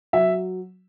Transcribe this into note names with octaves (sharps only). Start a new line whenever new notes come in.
F#3 E5